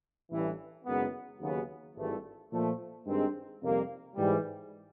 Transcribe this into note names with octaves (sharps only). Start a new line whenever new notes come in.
A1 G2 E3
F#1 F#2 D#3 G#3 B3
D#2 C#3 F#3 B3
G#1 G2 E3 A3
A#2 F3 A3
G2 D#3 G#3 C4
F2 C3 D#3 G3 A#3
G#2 E3 G3